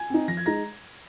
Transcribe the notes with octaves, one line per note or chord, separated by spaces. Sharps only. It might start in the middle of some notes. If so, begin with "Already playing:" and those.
Already playing: G#5 G#6
C4 D#4
F3 A#6
G#6
G#3 D#4 A#5 A#6